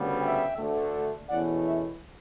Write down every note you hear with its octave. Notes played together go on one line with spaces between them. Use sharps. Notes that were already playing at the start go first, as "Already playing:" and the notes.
Already playing: D2 C#3 G3 B3
E5 G5
D2 D3 A3
E2 B2 A3 C#4 E4 D5 F#5
C#5 E5